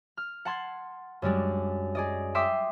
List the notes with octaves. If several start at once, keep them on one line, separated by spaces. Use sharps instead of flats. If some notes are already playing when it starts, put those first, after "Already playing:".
F6
F#5 A5 C6 G#6 C7
F#2 G3 G#3 D4
G#4 D5 D#5
E5 G5 C6 D6 D#6 B6